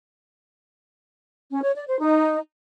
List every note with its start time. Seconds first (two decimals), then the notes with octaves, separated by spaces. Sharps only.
1.51 C#4
1.63 C#5
1.75 D5
1.87 C5
1.99 D#4